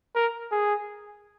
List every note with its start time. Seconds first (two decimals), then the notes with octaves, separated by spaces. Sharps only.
0.15 A#4
0.51 G#4